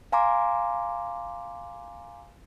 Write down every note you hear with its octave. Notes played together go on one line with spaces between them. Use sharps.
F5 G#5 A#5 C6 D6